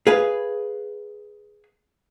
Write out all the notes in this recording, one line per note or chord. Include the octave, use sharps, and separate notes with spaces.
G#4 B4 F5